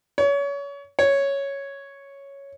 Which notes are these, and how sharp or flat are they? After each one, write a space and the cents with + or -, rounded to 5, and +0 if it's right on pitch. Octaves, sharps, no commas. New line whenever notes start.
C#5 +30
C#5 +0